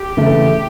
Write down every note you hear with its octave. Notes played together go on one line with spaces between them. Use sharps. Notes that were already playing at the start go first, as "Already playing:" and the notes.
Already playing: G4
C#3 E3 A3